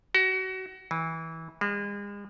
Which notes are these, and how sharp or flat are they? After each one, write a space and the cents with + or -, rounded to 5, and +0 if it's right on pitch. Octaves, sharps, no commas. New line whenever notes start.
F#4 +30
E3 -20
G#3 -40